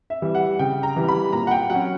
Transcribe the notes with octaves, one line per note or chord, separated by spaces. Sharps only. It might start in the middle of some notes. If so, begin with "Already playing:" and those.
E5
E3 G3
F#5
C#3 G5
A#5
E3 G3
B5
A#2 A#5
F#5
G5
F#3 C#4 F#5